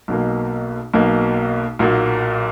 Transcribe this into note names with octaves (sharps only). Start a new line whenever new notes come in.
B1 B2 A#3
B1 B2 A#3
B1 A#2 F#3 A#3